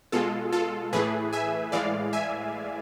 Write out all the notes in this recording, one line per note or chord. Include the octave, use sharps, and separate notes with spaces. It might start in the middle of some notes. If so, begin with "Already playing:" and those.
B2 G#3 F4 A4
F4 A4
A2 E3 A3 G#4 B4
E5 G#5
A2 E3 G#3 D5 F5
E5 G#5